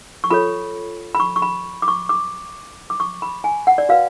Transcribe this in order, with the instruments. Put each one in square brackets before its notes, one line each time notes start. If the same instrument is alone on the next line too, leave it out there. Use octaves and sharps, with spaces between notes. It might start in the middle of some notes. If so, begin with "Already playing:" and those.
[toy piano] C#6
F4 A4 C#5 B5
B5
C#6
C#6
B5
D6
C#6
D6
D6
C#6
B5
G#5
F#5
D5
F#4 B4 F5